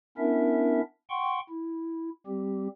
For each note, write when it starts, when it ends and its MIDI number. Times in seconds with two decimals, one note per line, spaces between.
0.18 0.81 59
0.18 0.81 61
0.18 0.81 62
0.18 0.81 64
0.18 0.81 70
0.18 0.81 76
1.10 1.39 78
1.10 1.39 79
1.10 1.39 84
1.10 1.39 85
1.49 2.10 64
2.27 2.68 55
2.27 2.68 60
2.27 2.68 67